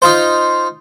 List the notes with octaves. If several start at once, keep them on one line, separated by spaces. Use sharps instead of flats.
D#4 F4 C5